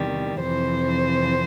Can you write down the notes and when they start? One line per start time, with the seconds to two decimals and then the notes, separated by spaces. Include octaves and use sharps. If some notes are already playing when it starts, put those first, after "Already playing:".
Already playing: E2 C3 D#3 G3
0.40 F2 C3 E3 C5